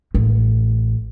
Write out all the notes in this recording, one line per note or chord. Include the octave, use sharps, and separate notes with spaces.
A1